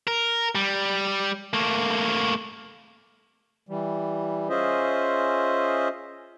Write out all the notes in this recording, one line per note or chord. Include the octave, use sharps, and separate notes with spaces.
A#4
G3
A3 A#3
E3 G3
C#4 F4 G#4 C5 D#5 E5